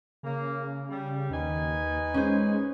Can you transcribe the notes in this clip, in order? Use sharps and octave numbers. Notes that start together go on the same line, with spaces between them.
C#3 A#3
G3
D#2 D#4 B4 G#5
G#3 C#4 C5